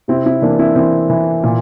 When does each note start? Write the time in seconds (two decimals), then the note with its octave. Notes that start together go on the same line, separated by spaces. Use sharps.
0.08 C3 C4 E4
0.25 C4 E4
0.42 E3 A#3 D4
0.59 C4 E4
0.75 E3 C4 E4
1.10 E3
1.44 A#2